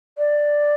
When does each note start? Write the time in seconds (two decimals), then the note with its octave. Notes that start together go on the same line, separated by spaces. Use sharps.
0.18 D5